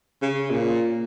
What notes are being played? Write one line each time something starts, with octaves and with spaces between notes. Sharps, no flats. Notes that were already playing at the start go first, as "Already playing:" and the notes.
C#3
A#2